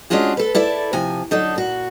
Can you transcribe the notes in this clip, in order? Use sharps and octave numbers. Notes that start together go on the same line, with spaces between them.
G#3 C#4 D4 F4 F#4 G#4
A4 B4
E4 A4 D5 E5
C3 F3 G#5
D3 F#3 D#4 A4
A#2 F#4